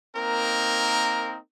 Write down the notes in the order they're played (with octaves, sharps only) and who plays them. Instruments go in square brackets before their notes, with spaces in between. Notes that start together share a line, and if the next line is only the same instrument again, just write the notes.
[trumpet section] A#3 C4 D#4 A#4